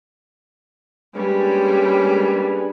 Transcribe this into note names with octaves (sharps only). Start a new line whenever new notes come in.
G3 G#3 A#3 C#4 D4 G#4 B4